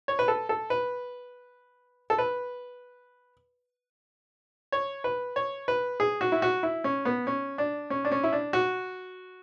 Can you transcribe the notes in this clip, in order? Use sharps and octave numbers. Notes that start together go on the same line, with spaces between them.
C#5
B4
A4
A4
B4
A4
B4
C#5
B4
C#5
B4
G#4
F#4
E4
F#4
E4
C#4
B3
C#4
D4
C#4
D4
C#4
E4
D4
F#4